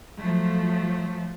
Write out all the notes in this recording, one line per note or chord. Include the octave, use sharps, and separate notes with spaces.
F3 F#3 A3